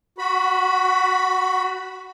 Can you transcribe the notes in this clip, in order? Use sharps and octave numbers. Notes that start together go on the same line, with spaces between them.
F#4 B5